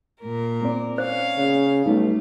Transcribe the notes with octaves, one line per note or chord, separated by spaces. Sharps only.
A#2 A#4
A#3 C4 D5
C#4 C5 F5
C#3
B1 G3 A3 D#4